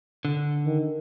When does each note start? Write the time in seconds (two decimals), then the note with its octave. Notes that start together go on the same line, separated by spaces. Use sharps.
0.25 D3
0.66 D#3